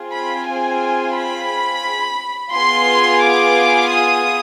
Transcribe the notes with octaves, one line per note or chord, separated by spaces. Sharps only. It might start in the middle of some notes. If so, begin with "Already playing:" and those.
Already playing: C4 F4 G#4
B5
G#5
B5
B3 F4 G#4 C6
D6
D#6